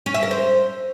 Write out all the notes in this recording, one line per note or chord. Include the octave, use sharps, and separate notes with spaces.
C#4
E5
A#4
C5